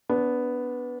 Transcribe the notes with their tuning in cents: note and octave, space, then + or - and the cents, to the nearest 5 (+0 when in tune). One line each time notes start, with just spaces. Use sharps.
B3 +0 D4 -25